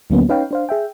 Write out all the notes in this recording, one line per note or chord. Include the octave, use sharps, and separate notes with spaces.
D2 D3 F#3 A#3 B3 C#4
C#4 D#4 B4 C#5 F5 G5
D4 C5 F5
G#4 E5 G5